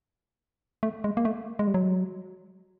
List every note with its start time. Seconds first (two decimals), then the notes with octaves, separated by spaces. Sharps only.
0.83 A3
1.04 G#3
1.17 A#3
1.25 A3
1.59 G#3
1.67 G3
1.74 F#3